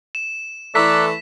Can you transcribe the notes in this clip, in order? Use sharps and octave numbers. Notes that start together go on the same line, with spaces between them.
E7
E3 A3 A4 D5 A#5 E6 F#6 B6